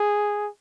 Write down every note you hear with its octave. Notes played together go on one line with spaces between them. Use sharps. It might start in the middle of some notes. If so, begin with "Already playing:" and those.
Already playing: G#4